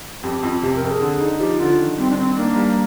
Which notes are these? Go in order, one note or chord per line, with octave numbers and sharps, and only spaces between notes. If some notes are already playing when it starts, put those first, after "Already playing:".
F2 G4
F2 F4
C3 G4
A#4
F2
G#4
D3
D#4
F3 G4
D#4
D3 F4
D#3
G3 C4
D4
D#3 C4
A#3 D4
G3